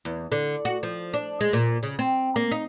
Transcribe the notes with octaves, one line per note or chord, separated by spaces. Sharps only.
E2
D3
F#4
F3
D4
G#3
A#2
C#3
C4
A#3
D#4